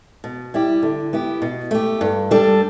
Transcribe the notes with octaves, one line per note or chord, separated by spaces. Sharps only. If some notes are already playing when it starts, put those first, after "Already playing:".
B2
G3 E4 G4
D3
B3 E4 G4
B2
A3 G4
G2
G3 D4 A4